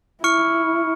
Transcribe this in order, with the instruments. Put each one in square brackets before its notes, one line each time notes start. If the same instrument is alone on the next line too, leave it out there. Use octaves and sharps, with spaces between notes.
[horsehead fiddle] E4 [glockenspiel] C#6 F6 C#7